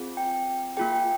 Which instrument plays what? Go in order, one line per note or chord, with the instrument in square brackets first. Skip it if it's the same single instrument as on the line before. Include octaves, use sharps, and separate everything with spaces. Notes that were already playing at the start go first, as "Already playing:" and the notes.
Already playing: [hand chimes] C4 F4 G#4
G5
A#3 F4 G#4 G5
G5